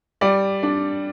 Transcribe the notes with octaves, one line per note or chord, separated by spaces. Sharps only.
G3 D5
D4